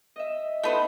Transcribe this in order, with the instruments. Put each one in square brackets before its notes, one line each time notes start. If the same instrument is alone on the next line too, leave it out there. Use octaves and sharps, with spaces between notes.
[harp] D#5 E5
[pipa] A3 B3 C5 [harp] D#4